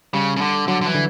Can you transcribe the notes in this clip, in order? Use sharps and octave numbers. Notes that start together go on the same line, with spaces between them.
C#3 G3
C#3
D3
D3 F#3
D3
E3
D3